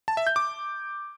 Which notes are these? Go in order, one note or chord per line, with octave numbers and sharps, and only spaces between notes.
A5
E5
G6
D6